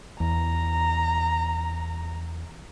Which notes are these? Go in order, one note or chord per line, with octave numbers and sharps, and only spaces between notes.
E2 A#5